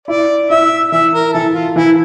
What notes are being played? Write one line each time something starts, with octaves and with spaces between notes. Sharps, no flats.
E4 D5
E4 E5
E3 E5
A#4
E3 A4
F4
E3 E4